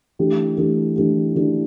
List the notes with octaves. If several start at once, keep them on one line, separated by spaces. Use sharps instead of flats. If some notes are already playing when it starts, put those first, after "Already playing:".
E3 A3 D4 G4
E3 A3 D4 G4
E3 A3 D4 G4
E3 A3 D4 G4